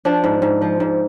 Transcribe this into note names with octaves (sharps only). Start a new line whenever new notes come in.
F3 D4
G#2
G#2
F3
G#2